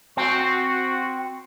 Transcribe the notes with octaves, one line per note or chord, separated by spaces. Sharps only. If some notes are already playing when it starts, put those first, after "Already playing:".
C4 F#4